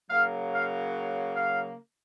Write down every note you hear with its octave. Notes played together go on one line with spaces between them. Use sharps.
C#3 F#3 A#3 F5
F5
F5